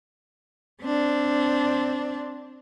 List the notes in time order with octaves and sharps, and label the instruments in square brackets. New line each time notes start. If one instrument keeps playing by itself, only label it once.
[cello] C4 D4